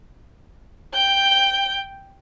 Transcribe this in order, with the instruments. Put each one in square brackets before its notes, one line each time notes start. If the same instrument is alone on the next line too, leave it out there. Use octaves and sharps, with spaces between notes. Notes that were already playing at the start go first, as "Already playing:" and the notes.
[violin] G5 G6